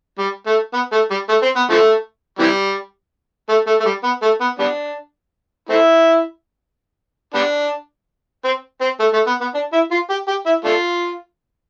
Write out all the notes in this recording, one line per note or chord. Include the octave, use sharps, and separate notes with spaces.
G3
A3
B3
A3
G3
A3
C4
B3
D3 F3 A3
C3 E3 G3
A3
A3
A3
G3
B3
A3
B3
G3 B3 D4
A3 C4 E4
G3 B3 D4
C4
C4
A3
A3
B3
B3
D4
E4
F4
G4
G4
E4
A3 D4 F4